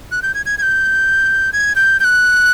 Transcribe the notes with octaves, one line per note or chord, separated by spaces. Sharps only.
F#6
G6
G#6
G#6
G#6
G6
G#6
G6
G6
F#6